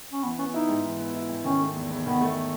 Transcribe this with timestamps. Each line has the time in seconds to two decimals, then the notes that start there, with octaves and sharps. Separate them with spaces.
0.12 C#4
0.23 E3 B3
0.38 B3 C#4
0.54 D#4 E4
0.69 G#2
0.84 E3
0.99 B3
1.14 E4
1.29 G#2
1.44 D#3 C#4
1.60 A3
1.75 E2
1.90 E2
2.06 D#3 B3
2.21 A3